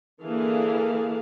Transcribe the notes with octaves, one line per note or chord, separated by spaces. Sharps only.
D3 E3 A#3 G#4 F5 A5